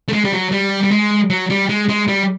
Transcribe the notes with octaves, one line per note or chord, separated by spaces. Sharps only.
A3
G#3
G3
F#3
G3
G3
G#3
F#3
G3
G#3
G#3
G3